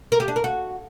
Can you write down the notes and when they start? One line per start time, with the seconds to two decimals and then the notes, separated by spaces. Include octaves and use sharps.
0.12 A#4
0.20 G4
0.28 D4
0.36 A#4
0.44 F#4